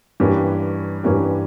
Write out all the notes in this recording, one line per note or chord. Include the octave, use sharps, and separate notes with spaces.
G2 E3 A#3 C#4 G4
G2 E3 A#3 C#4 G4